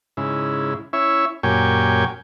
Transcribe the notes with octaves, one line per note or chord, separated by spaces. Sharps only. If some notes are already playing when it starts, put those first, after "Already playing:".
G#2 C#3 E4
C#4 E4 C#5 E5
F#2 A#2 G4 C#5 G5 G#5